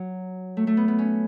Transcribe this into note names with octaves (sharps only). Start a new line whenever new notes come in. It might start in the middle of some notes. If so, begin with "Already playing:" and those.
Already playing: F#3
A3
A3
B3
B3
C#4